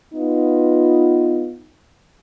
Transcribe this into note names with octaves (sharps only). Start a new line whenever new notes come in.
B3 D#4 F4